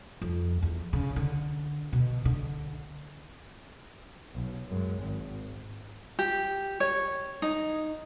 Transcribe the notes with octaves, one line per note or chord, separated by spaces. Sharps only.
F2
E2
C#3
D3
B2
D3
B1
F#2 G#3
G#1
G4
C#5
D#4